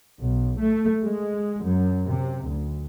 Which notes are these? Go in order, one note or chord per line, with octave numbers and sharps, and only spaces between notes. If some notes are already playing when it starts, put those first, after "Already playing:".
B1
A3
G#3
F#2
C3
D2